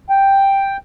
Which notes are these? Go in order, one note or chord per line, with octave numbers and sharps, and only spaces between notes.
G5